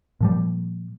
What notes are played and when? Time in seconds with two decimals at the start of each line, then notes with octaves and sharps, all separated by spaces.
0.21 A#2 F3 G3